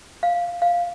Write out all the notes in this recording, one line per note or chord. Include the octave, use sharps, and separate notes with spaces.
F5
F5